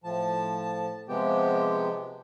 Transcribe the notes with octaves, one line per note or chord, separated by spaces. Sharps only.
A2 F3 A5
C3 F3 G#3 B3 G4 G5